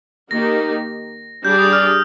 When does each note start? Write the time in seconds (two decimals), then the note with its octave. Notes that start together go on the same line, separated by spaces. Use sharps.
0.31 D#3 A#3 D#4 G4 A#6
1.45 G3 D4 G#4 D5 G6
1.58 D#6
1.73 F6
1.87 D#6